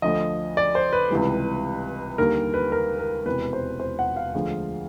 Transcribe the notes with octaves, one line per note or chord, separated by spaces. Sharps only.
D2 D3 F3 D#5
D5
C5
B4
C#2 C3 E3 G3
D#2 D3 G3 A#4
B4
A#4
A#4
E1 E2 C3 B4
C5
C5
F#5
F5
D2 D3 F3 G#3